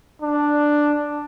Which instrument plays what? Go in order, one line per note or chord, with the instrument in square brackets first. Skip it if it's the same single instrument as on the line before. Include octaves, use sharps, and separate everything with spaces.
[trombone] D4